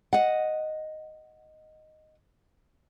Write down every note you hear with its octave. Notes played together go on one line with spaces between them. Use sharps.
D#5 F#5